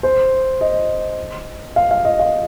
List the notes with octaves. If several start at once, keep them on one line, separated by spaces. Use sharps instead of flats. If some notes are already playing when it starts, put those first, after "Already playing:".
C5
D#5
F5
F5
D#5
F5